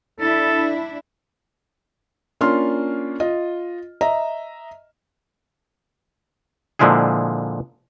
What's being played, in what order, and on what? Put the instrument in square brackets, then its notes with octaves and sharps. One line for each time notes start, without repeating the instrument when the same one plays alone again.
[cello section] D4 E4 [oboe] A4
[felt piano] A#3 C#4 D4 F4 C6 F6
F4 D#5
D#5 E5 A#5
[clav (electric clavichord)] A#2 D3 F3 G#3 E4 G#4